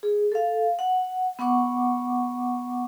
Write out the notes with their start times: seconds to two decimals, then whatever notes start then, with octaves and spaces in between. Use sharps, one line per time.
0.03 G#4
0.32 A4 F5
0.79 F#5
1.39 B3 F#5 C#6 D6